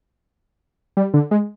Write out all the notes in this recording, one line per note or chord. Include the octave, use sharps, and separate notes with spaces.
G3
D3
G#3